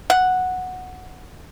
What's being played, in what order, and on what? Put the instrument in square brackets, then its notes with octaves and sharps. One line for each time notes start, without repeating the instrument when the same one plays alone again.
[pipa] F#5